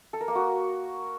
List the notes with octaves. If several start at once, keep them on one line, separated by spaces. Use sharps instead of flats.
A4
A#4
A#3
F#4